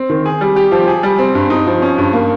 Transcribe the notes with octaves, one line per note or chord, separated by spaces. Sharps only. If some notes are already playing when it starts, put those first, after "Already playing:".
Already playing: C4
D#3
G#4
G3
G4
F3
G#4
G3
C4
G2
D#4
F3
C#4
G2
A#3